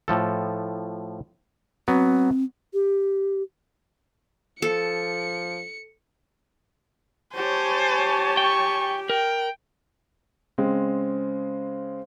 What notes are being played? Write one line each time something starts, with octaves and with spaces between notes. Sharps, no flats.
A2 F3 A4
F#3 B3 C4
G4
F3 A4 C#7
G4 C5 C#5 G#5 A5
G5 C#6
A#4 G5
C#3 G#3 C4